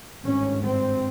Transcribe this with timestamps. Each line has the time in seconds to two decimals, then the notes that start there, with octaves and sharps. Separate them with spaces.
0.22 G#1 G2 C#4
0.63 C4